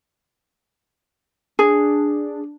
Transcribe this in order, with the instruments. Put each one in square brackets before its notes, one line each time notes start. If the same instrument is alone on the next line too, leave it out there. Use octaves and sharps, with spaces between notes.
[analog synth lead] D4 [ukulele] G#4